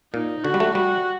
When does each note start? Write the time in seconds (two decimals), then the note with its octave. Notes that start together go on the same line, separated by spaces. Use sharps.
0.14 A#2 D#4
0.44 D3 F#4
0.54 G3
0.60 A3
0.75 G3 F#4